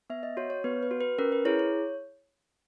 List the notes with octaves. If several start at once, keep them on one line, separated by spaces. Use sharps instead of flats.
B3 E5
D#5
F#4 C#5
C#5
B3 B4
B4
F#4
B4
C#4 A#4
B4
E4 G#4 C#5
C#5